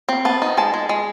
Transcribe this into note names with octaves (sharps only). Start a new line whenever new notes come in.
C4
B3 A5
D#4
G#3 A5
G#3
G#3